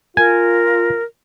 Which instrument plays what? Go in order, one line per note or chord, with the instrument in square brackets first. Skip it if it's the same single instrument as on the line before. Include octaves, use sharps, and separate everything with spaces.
[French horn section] F4 [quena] A#4 [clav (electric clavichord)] G#5